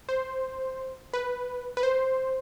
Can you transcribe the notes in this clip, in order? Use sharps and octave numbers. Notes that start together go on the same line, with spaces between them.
C5
B4
B4
C5